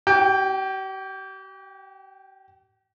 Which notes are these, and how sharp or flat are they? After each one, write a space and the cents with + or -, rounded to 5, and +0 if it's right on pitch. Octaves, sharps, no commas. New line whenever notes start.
G4 -40 G5 +15